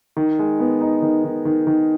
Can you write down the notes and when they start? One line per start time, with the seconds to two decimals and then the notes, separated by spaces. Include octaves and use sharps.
0.17 D#3
0.39 G#3
0.60 B3
0.81 D#4
1.02 D#3
1.24 D#3
1.45 D#3
1.67 D#3